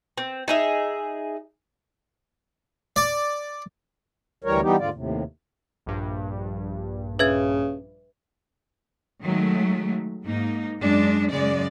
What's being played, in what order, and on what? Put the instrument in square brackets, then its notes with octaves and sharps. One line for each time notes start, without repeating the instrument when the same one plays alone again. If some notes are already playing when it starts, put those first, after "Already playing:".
[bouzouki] C4
D#4 G#4 E5
[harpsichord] D5
[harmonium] D2 E3 G3 A#4 C#5
E3 G3 B3 D#4 G4
D#2 G#2 D3 F4 D5
D#2 A2 C3
[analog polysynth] A#1 G2
[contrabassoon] C#3 [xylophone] B4 E5 G#6
[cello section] D#3 F#3 G#3 A3
G#2 A#3 D#4
F#2 G#3 D4
F#2 C#3 G#3 D5